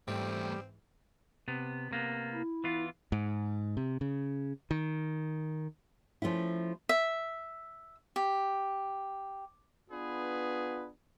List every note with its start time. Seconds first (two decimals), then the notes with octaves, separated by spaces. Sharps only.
0.08 E2 G#2 E3 G3 A3 C4
1.48 C3 B3
1.91 C3 A#3 B3
2.33 E4
2.64 E3 B3 F4
3.12 G#2
3.77 C3
4.01 C#3
4.71 D#3
6.22 F3 A3 C#4 E4
6.89 E5
8.16 G4
9.91 B3 D4 F4 G#4 B4